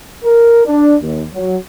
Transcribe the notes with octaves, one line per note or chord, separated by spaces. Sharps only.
A#4
D4
D#2
F#3